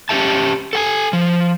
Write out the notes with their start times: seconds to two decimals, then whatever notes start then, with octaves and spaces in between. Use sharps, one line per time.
0.09 C#4 D#4 G4 E5 A5
0.73 A4 G5 G#5
1.13 F3